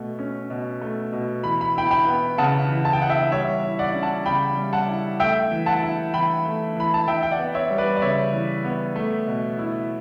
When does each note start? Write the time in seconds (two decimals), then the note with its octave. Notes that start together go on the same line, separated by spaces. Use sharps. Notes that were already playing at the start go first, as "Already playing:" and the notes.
Already playing: B2 A3
0.19 C#4
0.50 B2
0.81 A3
1.13 B2
1.44 E3 B5
1.61 B5
1.75 E4 G5 B5
1.91 G5 B5
2.07 B3
2.38 C#3 F#5 A5
2.69 E3
2.85 A5
2.93 G5
3.01 E4 F#5
3.09 E5 G5
3.32 G3 C#5 E5
3.64 E4
3.79 D5 F#5
3.95 C#4
4.03 F#5 A5
4.26 C#3 G5 B5
4.57 G3
4.73 F#5 A5
4.88 E4
5.20 A3 E5 G5
5.51 E3
5.66 F#5 A5
5.83 E4
6.14 E3 G5 B5
6.45 A3
6.77 E3 B5
6.94 A5
7.08 E3 E5 G5
7.23 G5
7.31 D5 F#5
7.39 B3
7.55 C#5 E5
7.70 G3
7.78 B4 D5
7.97 D5
8.02 C#3 C#5 E5
8.33 E3
8.65 B3
8.96 A3
9.27 B2
9.58 E4